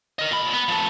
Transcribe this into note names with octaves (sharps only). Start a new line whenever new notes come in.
A#4 D#5
A#2 B5
B3
F3 A3